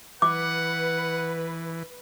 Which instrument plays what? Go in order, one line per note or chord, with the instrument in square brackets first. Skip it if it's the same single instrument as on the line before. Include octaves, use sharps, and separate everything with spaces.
[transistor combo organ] E3 [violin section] B4 [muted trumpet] F#5 [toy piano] D6